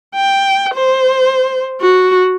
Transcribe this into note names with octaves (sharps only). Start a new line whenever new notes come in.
G5
C5
F#4